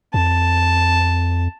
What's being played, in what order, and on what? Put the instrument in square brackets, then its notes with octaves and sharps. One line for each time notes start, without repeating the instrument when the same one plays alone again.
[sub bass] F2 [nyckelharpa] A5